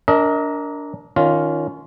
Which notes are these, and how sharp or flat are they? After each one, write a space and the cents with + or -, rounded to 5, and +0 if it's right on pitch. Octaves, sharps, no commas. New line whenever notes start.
D4 -20 A#4 +0 D#5 +35
D#3 +0 C#4 +20 F4 +0